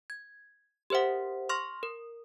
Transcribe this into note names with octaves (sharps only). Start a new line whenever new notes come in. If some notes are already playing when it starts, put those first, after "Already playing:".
G#6
G4 A#4 C5 E5 F#5
C6 C#6 F6 A#6
A#4